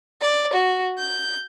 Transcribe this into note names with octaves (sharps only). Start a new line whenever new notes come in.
D5
F#4
G6